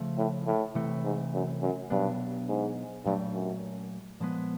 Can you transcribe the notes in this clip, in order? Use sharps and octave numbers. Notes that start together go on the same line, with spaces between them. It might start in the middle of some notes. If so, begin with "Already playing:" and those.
Already playing: C#3 F3 A3
A2
A2
C3 E3 A3
G#2
F#2
F#2
G2 B2 F#3 B3 D4
G#2
G2 A#2 F#3 A3
F#2
A#2 F3 G#3 B3